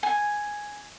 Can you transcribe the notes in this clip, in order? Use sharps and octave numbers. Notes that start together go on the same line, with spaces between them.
G#5